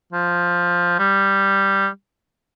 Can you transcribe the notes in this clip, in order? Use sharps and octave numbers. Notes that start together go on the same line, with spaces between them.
F3
G3